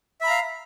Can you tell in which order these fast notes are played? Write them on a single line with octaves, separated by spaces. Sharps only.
E5 B5 A#5 F5